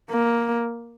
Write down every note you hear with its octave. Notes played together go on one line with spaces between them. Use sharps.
A#3